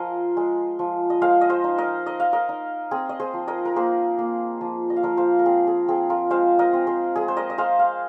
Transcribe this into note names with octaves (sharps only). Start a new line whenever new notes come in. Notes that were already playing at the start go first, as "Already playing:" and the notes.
Already playing: F3 G#4 A#4 C5 D#5 F5
G#3
F3
D#5
G#3 C5 F5
D#5
C5 F5
D#4
A#4 D#5
D#4 D#5
F5
A#4 D#5
D#4
C4 G#4
D#5
G#4 C5
F3
A#4 D#5
A#4
A#3 G#4 C5
A#3
F3
D#5
F5
F3 A#4 D#5
C5 F5
A#4
C4 G#4
G#4
C4 G#4
F4 A#4
G#3 C5 F5
A#4 D#5
C4
G#4 C5
G#3 G#4
C5
A#4 D#5
D#5
G#3 C5 F5
F5